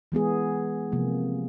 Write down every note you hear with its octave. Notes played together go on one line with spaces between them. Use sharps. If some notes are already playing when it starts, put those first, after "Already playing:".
E3 G#3 B3 G#4
C3 F3 A#3